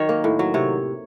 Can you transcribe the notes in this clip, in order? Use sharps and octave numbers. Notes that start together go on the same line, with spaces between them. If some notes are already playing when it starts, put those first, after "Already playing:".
Already playing: D#3 F#3 C#5
A#3
A2
F#3
C3 C#5